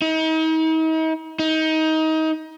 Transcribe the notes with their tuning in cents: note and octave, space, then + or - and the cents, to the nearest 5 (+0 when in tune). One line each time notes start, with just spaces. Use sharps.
D#4 +40
D#4 +25